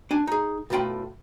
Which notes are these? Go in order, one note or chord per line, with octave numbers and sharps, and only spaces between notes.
D4 G#5
D#4 G#4
B1 F#2 A2 F4 G5 B5